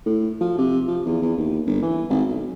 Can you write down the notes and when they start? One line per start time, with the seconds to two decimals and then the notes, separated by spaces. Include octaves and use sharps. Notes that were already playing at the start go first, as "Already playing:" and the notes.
0.06 A2
0.41 F3
0.58 C3
0.87 F3
1.06 E2
1.22 E2
1.37 D#2
1.66 G1
1.82 E3
2.09 G#1
2.28 B1